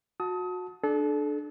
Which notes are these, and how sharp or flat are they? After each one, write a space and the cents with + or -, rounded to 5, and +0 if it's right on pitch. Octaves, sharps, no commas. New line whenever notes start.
F#4 -25 A5 +0 D#6 +30
D4 +15 A4 -35